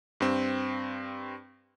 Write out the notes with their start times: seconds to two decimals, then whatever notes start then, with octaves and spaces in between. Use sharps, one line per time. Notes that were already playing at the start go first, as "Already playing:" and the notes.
0.20 G2 C4